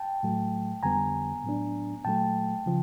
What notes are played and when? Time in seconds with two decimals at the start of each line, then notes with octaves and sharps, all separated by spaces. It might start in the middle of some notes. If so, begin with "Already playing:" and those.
Already playing: G5 A5
0.23 A2 F#3 A3
0.83 F2 D3 G3 B3 G#5 A#5
1.44 A2 F#3 B3 D4
2.05 A#2 F#3 A3 G5 A5
2.66 C#3 F3